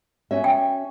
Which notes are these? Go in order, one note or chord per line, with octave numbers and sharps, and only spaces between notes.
C#4 F#4 E5
G5